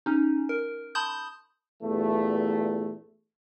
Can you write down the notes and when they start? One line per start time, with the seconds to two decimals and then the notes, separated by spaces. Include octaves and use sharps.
0.06 C#4 D#4
0.49 A#4
0.95 A5 B5 C6 D#6 G6
1.82 E2 G2 A#2 A3